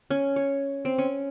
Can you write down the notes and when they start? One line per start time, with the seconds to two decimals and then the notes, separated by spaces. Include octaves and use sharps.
0.10 C#4
0.36 C#5
0.85 C4
0.98 C#4